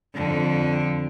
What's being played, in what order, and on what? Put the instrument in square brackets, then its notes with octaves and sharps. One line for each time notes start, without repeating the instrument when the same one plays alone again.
[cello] F2 D3